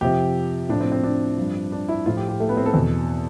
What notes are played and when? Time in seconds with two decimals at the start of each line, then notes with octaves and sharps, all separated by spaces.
0.01 F2 C3 F3 G4
0.69 A2 F3 D4
0.81 C4
0.92 C4
1.03 D4
1.38 G2 F3
1.72 D4
1.89 E4
2.06 A2 F3 F4
2.17 G4
2.29 G4
2.40 A3
2.49 B3
2.57 C4
2.66 A4
2.74 E2 B2